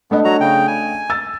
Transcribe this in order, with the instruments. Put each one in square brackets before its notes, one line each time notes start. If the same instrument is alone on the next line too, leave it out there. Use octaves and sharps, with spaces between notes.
[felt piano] A3 D4 D#5 [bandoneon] B3
[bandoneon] F#3 F#4 A#5
C#3 G5
G#5
[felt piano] E6 A6